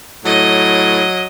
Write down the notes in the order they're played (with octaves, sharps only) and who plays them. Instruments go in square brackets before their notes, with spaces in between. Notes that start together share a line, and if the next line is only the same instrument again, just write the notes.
[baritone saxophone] A2 [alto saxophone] F#3 [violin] D#5